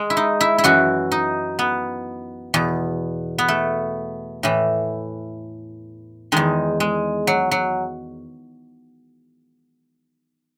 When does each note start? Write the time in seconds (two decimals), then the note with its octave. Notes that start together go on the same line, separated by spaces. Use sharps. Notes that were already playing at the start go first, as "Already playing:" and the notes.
Already playing: G#3
0.10 E4
0.17 D#4
0.41 E4
0.58 E4
0.64 F#2 E3 F#4
1.12 D#4
1.59 B3
2.54 E2 B2
3.38 B3
3.48 A3
4.43 A2 E3
6.32 E2 D#3 G#3
6.80 G#3
7.27 F#3
7.51 F#3